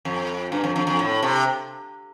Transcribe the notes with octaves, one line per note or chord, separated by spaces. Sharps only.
F2
G2
F2
F2
F2
A2
C3